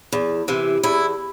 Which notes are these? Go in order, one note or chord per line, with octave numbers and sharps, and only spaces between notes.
E2
C3 E3
E2 E4